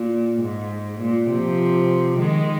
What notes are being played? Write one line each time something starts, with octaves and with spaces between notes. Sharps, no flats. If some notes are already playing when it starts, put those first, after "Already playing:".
Already playing: A#2
G#2
A#2
C3 F3
D#3 G#3